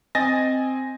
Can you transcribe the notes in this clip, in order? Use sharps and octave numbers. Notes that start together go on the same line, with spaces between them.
C4 D#5 G#5 A6 A#6